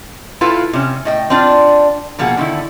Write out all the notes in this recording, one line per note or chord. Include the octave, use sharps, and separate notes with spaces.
E4 F4 A4 B4 F5
C3 C#4
A2 D#5 G5
C4 D4 F4 D5
B2 F3 A#3 G#4 F#5
D3 D#3 E4